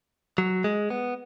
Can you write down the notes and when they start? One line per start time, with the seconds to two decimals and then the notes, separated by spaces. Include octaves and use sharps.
0.38 F#3
0.64 G#3
0.90 B3